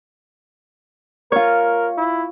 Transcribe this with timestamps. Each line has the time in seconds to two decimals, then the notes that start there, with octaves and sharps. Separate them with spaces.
1.32 F4 A#4 C#5
1.98 E4